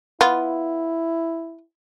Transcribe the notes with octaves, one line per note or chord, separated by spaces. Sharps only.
B3 E4 F4